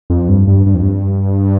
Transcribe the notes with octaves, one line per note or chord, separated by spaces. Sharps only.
F2
G2
G2
G2
F2
G2